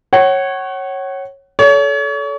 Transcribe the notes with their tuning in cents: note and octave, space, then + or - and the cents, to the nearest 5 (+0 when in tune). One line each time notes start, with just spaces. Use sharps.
C#5 -15 F#5 +30
A4 -15 C#5 +35